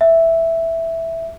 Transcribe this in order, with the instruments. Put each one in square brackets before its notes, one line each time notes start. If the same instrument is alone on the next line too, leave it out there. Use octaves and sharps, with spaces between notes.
[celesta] E5